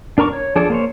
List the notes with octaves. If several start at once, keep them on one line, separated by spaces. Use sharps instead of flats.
D4 A#4 A#5 C#6 D6
C#5
F3 D4 G#4 A4 D5
A#3 C5 C#5